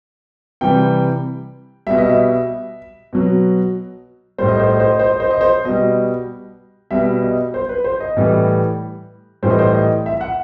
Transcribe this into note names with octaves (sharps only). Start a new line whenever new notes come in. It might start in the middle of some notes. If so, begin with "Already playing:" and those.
C3 E3 G3 G5
B2 G3 E5
D#5
E5
B2 F#3
A2 G3 C5
D#5
C5
D#5
C5
D#5
C5
D#5
C5
D#5
C5
B2 G3 D#5
B2 G3 E5
D#5
C5
B4
C5
D#5
A2 E3 G3
A2 E3 G3 C5
D#5
C5
D#5
E5
F#5